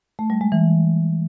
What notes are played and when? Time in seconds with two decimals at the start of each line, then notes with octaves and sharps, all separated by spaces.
0.19 A3
0.30 G3
0.41 G#3
0.52 E3